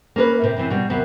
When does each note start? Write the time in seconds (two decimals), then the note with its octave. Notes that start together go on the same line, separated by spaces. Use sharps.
0.16 A#3 C#4 A#4 B4
0.42 A2 C3
0.57 F#2 C3 E3 C4
0.70 B2 G3
0.90 D#2 C3 F#3 B3